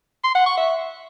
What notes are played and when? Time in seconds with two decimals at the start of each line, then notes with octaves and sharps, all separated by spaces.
0.24 C6
0.35 F#5
0.46 C#6
0.57 E5